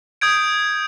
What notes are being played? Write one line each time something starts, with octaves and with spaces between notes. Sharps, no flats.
D#6 G6 G#6 D7